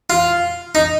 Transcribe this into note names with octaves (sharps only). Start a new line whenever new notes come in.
F4
D#4